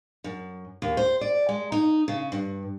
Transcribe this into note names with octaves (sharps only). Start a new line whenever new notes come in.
F#2
D#2
C5
D5
G#3
D#4
C#3
G2